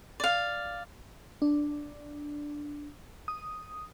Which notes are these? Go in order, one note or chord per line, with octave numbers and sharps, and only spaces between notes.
D5 F5
D4
D#6